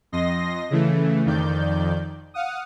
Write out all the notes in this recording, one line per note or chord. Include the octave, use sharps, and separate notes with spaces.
F2 D#5 C6 A#6
C#3 E3 A3
F2 D#3 D5 G6
F5 F#5 D#6